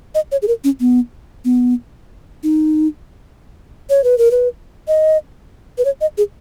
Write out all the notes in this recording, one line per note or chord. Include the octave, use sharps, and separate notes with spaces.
D#5
C#5
G#4
A#4
C#4
B3
B3
D#4
C#5
B4
A#4
B4
D#5
B4
C#5
D#5
G#4